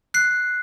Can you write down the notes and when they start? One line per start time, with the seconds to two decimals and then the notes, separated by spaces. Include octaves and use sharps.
0.14 F#6 C7